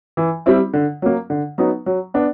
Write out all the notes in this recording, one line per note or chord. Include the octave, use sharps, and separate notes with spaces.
E3
G3 C4 E4
D3
F#3 A#3
D3
F#3 B3 D#4
F#3
B3 D4